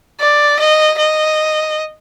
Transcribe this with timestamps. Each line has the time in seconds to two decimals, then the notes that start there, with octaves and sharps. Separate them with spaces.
0.20 D5
0.59 D#5
0.98 D#5